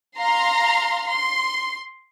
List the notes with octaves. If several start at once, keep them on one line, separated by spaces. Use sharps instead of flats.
F5 A#5 C6
C6